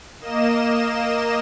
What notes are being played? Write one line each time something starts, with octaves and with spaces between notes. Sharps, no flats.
A#3 D#5 E7